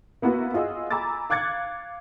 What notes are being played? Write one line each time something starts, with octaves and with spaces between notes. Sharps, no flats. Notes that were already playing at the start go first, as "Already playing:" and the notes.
A#3 B3 E4 F#4 B4
F4 G#4 D#5 F#5 E6
G#5 A#5 B5 D6 E6 A6
F5 D6 F#6 G#6 A6 C#7